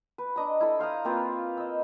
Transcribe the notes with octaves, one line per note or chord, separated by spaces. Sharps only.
B4
D4 D#5 A#5
E4 A4
C5 F5 A#5 D#6
A#3 C4 F4 B4
D#5 E6